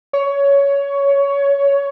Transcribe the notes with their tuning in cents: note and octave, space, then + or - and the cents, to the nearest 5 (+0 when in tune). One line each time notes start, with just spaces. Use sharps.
C#5 +15